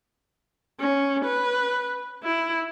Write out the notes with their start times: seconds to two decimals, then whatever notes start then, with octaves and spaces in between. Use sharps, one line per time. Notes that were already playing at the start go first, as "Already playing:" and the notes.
0.80 C#4
1.25 B4
2.23 E4